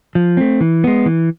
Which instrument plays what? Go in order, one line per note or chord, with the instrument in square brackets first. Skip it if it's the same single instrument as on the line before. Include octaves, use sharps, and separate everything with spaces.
[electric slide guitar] F3
A3 C4
E3
G#3 B3
E3